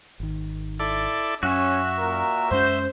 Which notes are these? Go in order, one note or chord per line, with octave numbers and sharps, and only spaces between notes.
G#1 D#3
E4 A4 D5
F#2 C#4 F#4 E5
A#2 A#4
F#2 G#3 C#4 C5